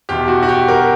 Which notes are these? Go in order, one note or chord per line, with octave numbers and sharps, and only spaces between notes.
E2 B2 G4
F#4
F#4
G4
A#4